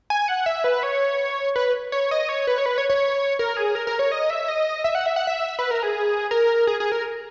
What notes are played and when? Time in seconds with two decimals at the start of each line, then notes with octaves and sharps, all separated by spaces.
0.10 G#5
0.28 F#5
0.46 E5
0.64 B4
0.83 C#5
1.56 B4
1.92 C#5
2.11 D#5
2.29 C#5
2.47 B4
2.58 C#5
2.66 B4
2.78 C#5
2.89 C#5
3.39 A#4
3.57 G#4
3.75 A#4
3.87 A#4
3.99 C#5
4.12 D#5
4.30 E5
4.48 D#5
4.84 E5
4.95 F#5
5.06 E5
5.16 F#5
5.27 E5
5.59 B4
5.71 A#4
5.83 G#4
6.31 A#4
6.67 G#4
6.80 G#4
6.92 A#4